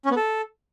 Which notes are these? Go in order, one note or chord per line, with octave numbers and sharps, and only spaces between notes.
C#4
B3
A4